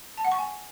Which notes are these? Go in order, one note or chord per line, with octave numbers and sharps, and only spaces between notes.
A5
F#5
C#6
G#5